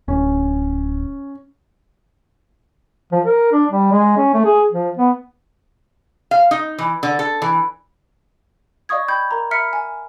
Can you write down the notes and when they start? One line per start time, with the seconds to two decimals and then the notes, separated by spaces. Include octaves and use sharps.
0.08 D1 C#4
3.12 F3
3.25 A#4
3.52 D4
3.71 G3
3.92 G#3
4.17 C#4
4.34 A3
4.45 G#4
4.71 F3
4.97 B3
6.31 F5
6.51 D#4
6.79 E3
7.03 D3
7.19 A4
7.42 E3
8.89 D5 D#5 F5 C#6 D#6 G#6
9.08 G5 B5 G6 G#6
9.31 A#4 A#5
9.51 E5 A#5 B5 F6 B6 C#7
9.73 G#5